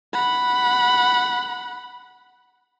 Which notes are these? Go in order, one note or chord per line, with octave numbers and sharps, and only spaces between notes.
F#5 B5